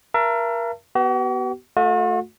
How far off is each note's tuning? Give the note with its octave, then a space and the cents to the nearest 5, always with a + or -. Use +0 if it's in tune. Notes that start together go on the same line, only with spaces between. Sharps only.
A#4 +25 E5 +40 A5 +40
B3 +0 F#4 +45
A3 +0 F#4 -45 E5 -20